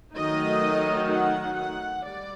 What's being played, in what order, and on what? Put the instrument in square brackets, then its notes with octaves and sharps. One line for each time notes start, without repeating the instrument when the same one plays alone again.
[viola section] D#3 F#3 A3 D#4 D#5
F#5
F#5
G3 D5